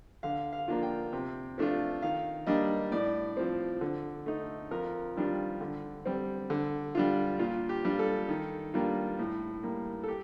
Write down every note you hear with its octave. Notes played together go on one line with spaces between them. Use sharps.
D3 F5
F5
F3 A#3 D4 F4
G5
C3
F3 A3 D4 F4
D#3 F5
G3 A#3 D4 D#5
A2 D5
F3 C4
D3
A3 D#4
F2 A#4
D#3 G3 D4 F4
D3
G3 C4
D3
G3 D4 F4
A#2 F4
G4
G3 D4 F4
A4
D#3
G3 A#3 D4 F4
A2
G3 A#3
A4
G4